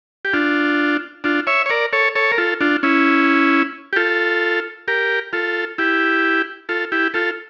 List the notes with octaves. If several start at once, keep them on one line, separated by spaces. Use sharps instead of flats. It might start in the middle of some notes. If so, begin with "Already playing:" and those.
G4
D4 F4
D4 F4
C#5 E5
C#5
A#4 D5
A4 C#5
A4 C#5
A#4
F4 A4
D4 F4
C#4 E4
G4
F4 A4
G4 A#4
F4 A4
E4 G4
F4 A4
E4 G4
F4 A4